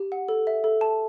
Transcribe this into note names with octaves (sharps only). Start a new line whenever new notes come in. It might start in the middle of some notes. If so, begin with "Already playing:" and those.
Already playing: G4
F#5
A4
E5
A4
A5